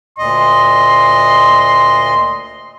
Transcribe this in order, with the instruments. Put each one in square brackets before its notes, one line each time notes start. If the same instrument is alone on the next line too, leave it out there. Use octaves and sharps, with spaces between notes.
[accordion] D2 A#2 D#5 [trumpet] C6